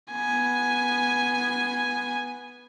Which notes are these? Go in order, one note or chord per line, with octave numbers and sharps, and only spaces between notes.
B3 G#5